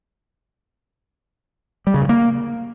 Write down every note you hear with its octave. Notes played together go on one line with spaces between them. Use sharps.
G3
C#3
G2
A#3